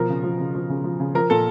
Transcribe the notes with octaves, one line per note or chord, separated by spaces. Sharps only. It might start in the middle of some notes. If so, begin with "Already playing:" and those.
Already playing: B2 F3 A#4
C#3
F3
C#3
F3
C#3
F3
C#3
F3 A#4
A#2 A4